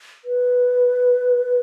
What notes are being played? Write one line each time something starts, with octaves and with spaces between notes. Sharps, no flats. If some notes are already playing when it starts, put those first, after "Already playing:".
B4